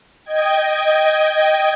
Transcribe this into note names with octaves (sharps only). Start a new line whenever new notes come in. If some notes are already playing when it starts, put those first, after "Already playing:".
D#5 G5 G#6